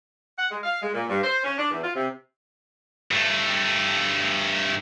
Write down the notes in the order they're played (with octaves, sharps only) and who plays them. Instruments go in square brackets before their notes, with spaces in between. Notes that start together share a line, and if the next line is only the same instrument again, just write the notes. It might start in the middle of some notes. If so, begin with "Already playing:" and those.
[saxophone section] F#5
G#3
F5
G#3
A#2
G2
C5
C#4
D4
E2
F4
C3
[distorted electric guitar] G2 A3